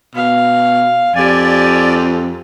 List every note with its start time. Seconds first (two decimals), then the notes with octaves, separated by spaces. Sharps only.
0.15 B2 F5
1.16 F2 G4 D5 G#5